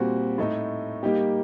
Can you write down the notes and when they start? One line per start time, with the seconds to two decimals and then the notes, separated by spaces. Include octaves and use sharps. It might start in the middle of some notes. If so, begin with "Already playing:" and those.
Already playing: A#2 G3 C4 F#4
0.38 A2 A3 D#4
1.03 G3 A#3 D#4 G4